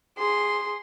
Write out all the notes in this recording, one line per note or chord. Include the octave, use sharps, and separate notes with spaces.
G#4 C6